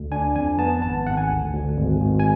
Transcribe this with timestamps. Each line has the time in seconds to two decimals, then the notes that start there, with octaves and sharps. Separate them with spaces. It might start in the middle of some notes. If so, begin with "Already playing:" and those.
Already playing: D2
0.12 D4 G#5
0.35 F2 G#5
0.59 B3 A5
0.82 G#1 A5
1.07 G#1 F#5
1.17 G#5
1.29 D2
1.53 D2
1.76 G#1
2.00 G#1
2.20 G#5